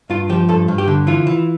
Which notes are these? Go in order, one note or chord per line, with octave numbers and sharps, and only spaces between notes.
G2 F4
F3 G4
G2 A4
G2
G4
D3
E3 F4
E3